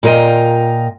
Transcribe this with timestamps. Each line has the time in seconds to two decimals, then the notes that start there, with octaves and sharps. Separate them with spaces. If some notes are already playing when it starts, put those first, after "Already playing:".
0.03 A#2 F4 A#4 D#5 G5